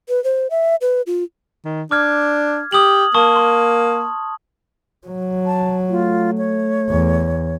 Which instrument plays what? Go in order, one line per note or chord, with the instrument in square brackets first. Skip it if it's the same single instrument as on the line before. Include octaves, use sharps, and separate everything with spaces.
[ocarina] B4
C5
E5
B4
F4
[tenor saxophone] D#3
[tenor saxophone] D4 [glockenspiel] D6 F6 G#6
[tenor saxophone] G4 [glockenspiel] D#6 F#7
[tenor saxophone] A#3 [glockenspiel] A5 C#6 D#6
[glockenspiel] C6
[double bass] F#3
[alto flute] A5
[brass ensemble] A3 [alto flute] F4
[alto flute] C#5
[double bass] E2